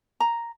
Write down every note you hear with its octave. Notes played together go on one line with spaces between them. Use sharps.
A#5